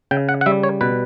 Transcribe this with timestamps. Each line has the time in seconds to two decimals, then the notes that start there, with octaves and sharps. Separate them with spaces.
0.11 C#3 G5
0.29 F#5
0.41 F#5
0.46 G3 E5
0.63 C#5
0.81 B2 B4